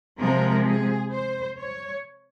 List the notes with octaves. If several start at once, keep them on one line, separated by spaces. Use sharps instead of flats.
C3 F3 G#3 A#4
G#4
C5
C#5